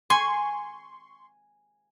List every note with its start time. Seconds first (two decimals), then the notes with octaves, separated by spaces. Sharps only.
0.10 G#5 C6 C#6